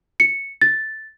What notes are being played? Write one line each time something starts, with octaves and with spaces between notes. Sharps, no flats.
C#7
A6